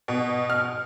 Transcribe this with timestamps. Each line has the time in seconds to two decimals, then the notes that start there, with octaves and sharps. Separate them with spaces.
0.08 B2
0.50 F6